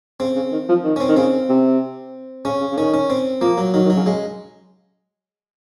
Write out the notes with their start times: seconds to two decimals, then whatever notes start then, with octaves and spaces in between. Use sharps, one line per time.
0.20 C#3 C4
0.35 C#3
0.52 D#3
0.69 F3
0.84 D#3
0.96 C#4
1.00 C4
1.08 D#3
1.16 C#3 C4
1.49 C3
2.45 C#3 C#4
2.61 C#3
2.72 C#3
2.78 D#3 C#4
2.94 C#4
3.10 C4
3.41 F3 A#3
3.58 F#3
3.74 D#3 F#3
3.85 D#3
3.90 F#3
3.96 C#3
4.06 C#3 G#3